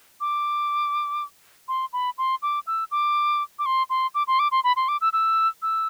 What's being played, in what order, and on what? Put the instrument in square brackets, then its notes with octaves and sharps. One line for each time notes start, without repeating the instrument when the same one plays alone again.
[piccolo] D6
C6
B5
C6
D6
E6
D6
D6
C6
C6
D6
C6
D6
C6
B5
C6
D6
E6
E6
E6